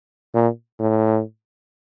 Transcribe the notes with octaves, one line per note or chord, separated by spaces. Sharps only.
A#2
A2